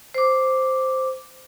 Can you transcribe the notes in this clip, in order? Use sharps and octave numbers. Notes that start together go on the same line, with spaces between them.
C5 D6